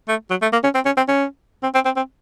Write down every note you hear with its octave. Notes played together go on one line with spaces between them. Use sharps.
A3
F#3
A3
A#3
C#4
C4
C#4
C4
C#4
C4
C4
C4
C4